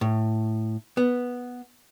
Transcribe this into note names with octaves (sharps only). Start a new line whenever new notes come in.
A2
B3